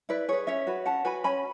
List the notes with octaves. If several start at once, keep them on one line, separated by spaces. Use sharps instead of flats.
E4 B4 D5
G#4 B4 C#5
C#4 C#5 E5
F#4 B4
C#4 F#5 A5
F#4 B4 G#5 B5
C#4 G#5 B5